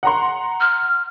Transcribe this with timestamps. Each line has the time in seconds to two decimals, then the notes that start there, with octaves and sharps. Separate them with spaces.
0.03 F#5 A#5 C6
0.60 F6